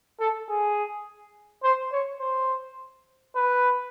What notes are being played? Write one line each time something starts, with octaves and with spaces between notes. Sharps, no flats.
A4
G#4
C5
C#5
C5
B4